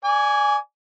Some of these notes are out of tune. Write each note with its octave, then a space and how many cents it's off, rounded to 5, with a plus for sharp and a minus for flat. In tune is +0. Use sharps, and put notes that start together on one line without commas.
D5 +0 G#5 +0 D6 -40